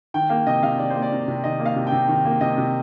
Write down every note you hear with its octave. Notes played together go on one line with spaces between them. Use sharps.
D#3 G5
A#3 F5
C3 D#5
C3 F5
D#3 D5
A#3 C5
D5
C3
C3
D#3 D#5
A#3
F5
C3
G5
C3
D#3
A#3
C3 D#5
C3